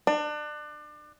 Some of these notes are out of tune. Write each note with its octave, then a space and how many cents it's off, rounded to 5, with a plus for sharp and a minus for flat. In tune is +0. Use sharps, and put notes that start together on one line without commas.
D4 +30